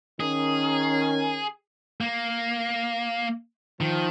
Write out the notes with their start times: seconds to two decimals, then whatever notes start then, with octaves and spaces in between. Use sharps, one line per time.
0.20 D#3 C#4 G#4 A#4
2.01 A#3
3.80 D#3 F3